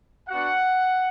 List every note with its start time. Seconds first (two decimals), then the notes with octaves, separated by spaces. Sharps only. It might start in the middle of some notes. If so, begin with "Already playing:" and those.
0.29 B3 D4 F#4 F#5